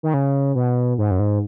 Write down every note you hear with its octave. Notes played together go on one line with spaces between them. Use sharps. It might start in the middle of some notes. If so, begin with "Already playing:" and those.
D#3
C#3
B2
G#2
F#2
G#2